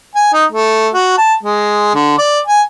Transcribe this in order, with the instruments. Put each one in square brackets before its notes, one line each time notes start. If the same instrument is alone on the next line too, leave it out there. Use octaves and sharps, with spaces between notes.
[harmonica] G#5
D#4
A3
F#4
A5
G#3
D3
D5
G#5